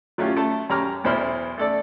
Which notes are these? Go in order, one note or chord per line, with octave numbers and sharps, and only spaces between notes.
F#3 A3 C#4 F4 G4
A3 A5
F#2 G4 C#5 A#5 D6 F6
B1 E2 E4 C5 B5 F6
A3 A4 D5